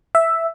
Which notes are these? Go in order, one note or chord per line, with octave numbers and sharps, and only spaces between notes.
E5